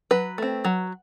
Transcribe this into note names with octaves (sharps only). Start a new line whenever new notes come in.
F#3 B4
A3 C4
F#3